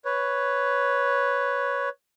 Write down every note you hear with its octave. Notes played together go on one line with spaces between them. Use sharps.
B4 C#5